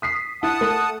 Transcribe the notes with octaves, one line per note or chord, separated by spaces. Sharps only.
D#6 B6 C7
E4 F#5 A5 D#6
A3